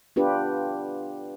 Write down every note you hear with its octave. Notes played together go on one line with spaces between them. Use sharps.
B3 D4 F4 G4 B4